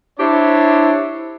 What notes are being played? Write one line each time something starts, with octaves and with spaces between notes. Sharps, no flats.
D4 E4 G4 C5 C#5 E5